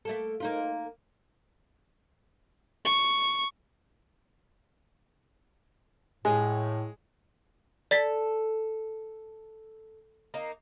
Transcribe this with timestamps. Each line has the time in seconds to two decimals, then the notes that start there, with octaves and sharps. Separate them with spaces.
0.05 A3 A#3 A4
0.40 A#3 D#4 F4
2.85 C#6
6.25 A2 G#3 G#5
7.91 A4 D5 A6 B6
10.34 A#3 D#4